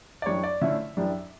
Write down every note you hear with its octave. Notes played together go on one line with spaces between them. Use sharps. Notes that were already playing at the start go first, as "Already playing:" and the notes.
D5
F#2 E3 G3 D4 C#5
D5
D3 A3 C#4 E4 E5
F#2 E3 G3 D4